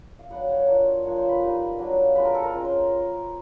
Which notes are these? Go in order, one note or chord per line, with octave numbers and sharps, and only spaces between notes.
F5
F#3 B3 D4 F#5
C#5
A#3 D4 F4
F3 A#3 D4 C#5
C5
B4
G3 A#3 D#4
F#3 A#3 D4 F4
G#3 C4 F4 B4
A#4
A4
A#4
G#3 C#4 F4
C5